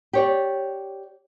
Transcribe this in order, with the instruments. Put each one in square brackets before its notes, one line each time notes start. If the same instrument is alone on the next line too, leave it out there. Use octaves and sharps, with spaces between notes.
[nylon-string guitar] G4 C#5 D5